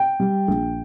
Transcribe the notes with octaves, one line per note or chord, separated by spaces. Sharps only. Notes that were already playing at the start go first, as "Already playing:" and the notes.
Already playing: G5
G3
A#1